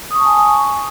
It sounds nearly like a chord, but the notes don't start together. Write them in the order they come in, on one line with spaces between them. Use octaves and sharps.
D#6 C#6 A5 G#5